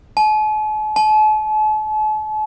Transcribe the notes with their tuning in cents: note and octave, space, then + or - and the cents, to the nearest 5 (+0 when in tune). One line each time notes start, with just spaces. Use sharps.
A5 -45
A5 -40